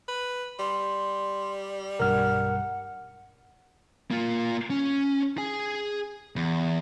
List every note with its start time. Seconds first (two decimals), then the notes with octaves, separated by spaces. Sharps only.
0.08 B4
0.59 G3 C6
2.00 B1 G2 A#4 F#5 F6
4.11 A#3 F4
4.70 C#4
5.38 G#4 G#5
6.36 E2